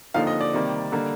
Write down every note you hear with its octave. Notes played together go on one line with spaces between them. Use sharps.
D#2 D3 F3 C4 D#4 F5
D#5
D5
C3 D#3 G3 A#3
D3 G3 A#3